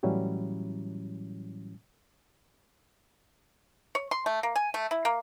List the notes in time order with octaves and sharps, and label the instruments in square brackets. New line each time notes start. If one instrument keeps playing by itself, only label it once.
[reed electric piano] A2 E3 F#3 G3 C#4 E4
[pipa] C#5
C6
A3
A#3
G#5
A3
E4
A#3